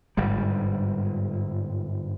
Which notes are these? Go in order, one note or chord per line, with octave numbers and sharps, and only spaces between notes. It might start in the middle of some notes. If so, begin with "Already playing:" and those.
G1 G#2 G3